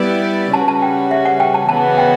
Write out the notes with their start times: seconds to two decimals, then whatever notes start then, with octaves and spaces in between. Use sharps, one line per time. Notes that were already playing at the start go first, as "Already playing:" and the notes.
Already playing: G3 B3 E4 G4 D5
0.53 C#3 G3 C#4 F#4 B4 A5
0.68 A5
0.82 G5
1.11 E5
1.25 F#5
1.40 G5
1.54 A5
1.69 C#3 E3 B3 F#4 A5
1.98 G5